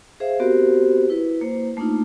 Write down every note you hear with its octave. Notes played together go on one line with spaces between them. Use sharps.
G#4 C5 E5 F5
B3 C4 F#4 G4 A#4 C5
E4 B4
A#3 C5 A#5
A3 A#3 D4 D#4 F4